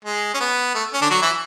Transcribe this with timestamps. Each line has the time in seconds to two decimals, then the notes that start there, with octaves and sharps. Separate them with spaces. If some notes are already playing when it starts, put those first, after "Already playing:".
0.05 G#3
0.34 C#4
0.40 B3
0.75 A3
0.93 C#4
1.02 D3 D4
1.10 F#3 F#4
1.22 E3 E4